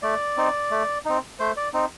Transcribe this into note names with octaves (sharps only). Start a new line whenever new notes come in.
A3 D5
C4 D#4
A3
C4 D#4
A3 C5
D5
C4 D#4